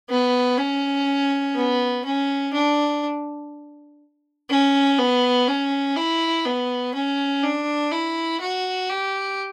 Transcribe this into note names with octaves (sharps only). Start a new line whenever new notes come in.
B3
C#4
B3
C#4
D4
C#4
B3
C#4
E4
B3
C#4
D4
E4
F#4
G4